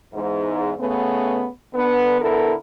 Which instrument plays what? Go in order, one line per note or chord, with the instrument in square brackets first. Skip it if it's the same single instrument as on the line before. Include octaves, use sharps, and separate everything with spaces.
[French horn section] E2 G#2
C#3 A3 B3
D3 B3
D3 B3 E4 A4 A#4